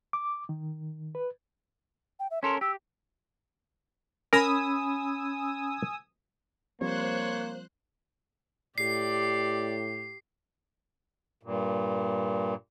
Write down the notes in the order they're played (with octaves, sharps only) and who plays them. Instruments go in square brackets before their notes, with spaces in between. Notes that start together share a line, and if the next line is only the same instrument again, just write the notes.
[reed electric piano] D6
D#3
B4
[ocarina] G5
E5
[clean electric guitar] C#4 A4 A#4 [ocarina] C6
[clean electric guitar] G4 [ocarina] E6
[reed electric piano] C#4 B5 [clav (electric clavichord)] A#4 A#5 [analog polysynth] G#5 D#6 E6
[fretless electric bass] F3 G3 C4 [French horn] A#3 [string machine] C5 F#6 [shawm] C#5
[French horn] A2 [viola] G4 [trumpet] D5 [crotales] C7
[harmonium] G2 A#2